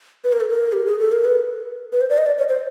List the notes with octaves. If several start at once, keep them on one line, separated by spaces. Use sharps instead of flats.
B4
A#4
A4
A#4
G4
G#4
A4
A#4
B4
B4
C5
D5
D#5
D5
C#5
C5